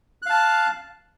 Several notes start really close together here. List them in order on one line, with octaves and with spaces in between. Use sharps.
F#6 F5 A5